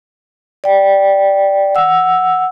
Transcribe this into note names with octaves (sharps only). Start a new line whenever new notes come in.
D5 G5
F#5 E6